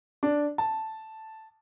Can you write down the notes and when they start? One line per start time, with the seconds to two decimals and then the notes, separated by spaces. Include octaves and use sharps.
0.23 D4
0.58 A5